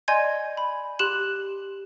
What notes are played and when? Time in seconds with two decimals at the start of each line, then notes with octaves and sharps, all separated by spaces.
0.08 D5 D#5 G#5 C6 G6 G#6
0.57 B5
0.99 G4 C6 F#6 E7 F#7